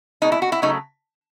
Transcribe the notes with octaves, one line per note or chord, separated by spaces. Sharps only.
B2 G#3 D#4
E4
F#4
E4
C#3 F#3 A3 D#4